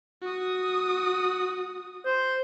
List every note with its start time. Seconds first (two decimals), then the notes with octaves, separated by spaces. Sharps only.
0.22 F#4 D#6
2.05 C5